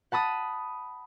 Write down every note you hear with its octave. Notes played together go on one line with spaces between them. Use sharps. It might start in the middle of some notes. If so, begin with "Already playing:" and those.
F#5 A5 B5 D#6